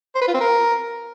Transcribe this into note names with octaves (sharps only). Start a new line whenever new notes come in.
C5
B4
F4
C4
A#4